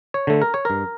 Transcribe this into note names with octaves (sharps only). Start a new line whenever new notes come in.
C#5
D3 A3
A#4
C#5
G2 A#4